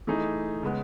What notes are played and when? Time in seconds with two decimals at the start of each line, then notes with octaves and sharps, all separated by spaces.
0.07 E3 A3 D#4 G#4
0.63 C#3 G#3 B3